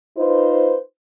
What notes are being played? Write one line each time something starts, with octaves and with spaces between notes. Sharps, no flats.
D#4 F4 B4 C5